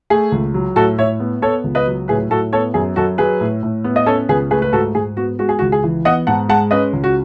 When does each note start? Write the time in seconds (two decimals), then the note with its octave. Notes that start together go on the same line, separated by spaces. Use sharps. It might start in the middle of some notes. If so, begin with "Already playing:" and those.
0.10 A3 G#4
0.32 C#2
0.54 F#3
0.76 A2 F#4 A4
0.98 A2 C#5 E5
1.20 B3
1.42 B3 A4 C#5
1.64 C#2
1.75 B4 D#5
1.87 F#3
2.08 A2 G#4 B4
2.30 A2 F#4 A4
2.53 B3 A4 C#5
2.74 F#2 G#4
2.96 F#2 F#4 A4
3.18 F#3 G#4 B4
3.41 A2
3.63 A2
3.84 B3
3.96 D#5
4.06 C#4 A4 C#5
4.29 C#2 G#4 B4
4.51 A3 G#4 B4
4.62 B4
4.72 G#2 F#4 A4
4.95 G#2 G#4
5.17 B3 F#4
5.39 G#3 F#4
5.49 G#4
5.59 F#4
5.62 C#2
5.72 G#4
5.84 E3
6.05 B3 D#5 F#5
6.27 G#2 F#5 A5
6.49 G#3 F#5 A5
6.71 C#4 B4 D#5
6.93 C#2
7.04 F#4